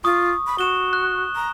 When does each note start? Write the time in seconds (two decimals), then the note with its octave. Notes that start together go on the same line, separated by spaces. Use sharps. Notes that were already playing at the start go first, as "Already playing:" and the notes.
0.04 F4 C#6 D#6
0.47 B5
0.58 F#4 C#6 E7 G7
0.93 F#6
1.35 A#5